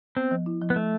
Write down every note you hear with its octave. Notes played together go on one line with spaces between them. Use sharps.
B3 C4
F3
E4
F3
B3
A3